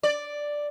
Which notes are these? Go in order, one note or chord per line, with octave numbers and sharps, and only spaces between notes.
D5